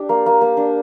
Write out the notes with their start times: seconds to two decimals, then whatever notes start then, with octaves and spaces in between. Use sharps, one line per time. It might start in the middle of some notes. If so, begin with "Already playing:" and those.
Already playing: D4 G4
0.09 A#3
0.26 A#3
0.41 A#3
0.57 D4